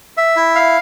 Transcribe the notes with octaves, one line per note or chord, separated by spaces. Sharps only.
E5
E4
F5